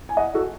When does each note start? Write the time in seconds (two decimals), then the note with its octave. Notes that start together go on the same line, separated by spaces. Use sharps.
0.09 G#5
0.17 D#5 F#5
0.34 F#4 A4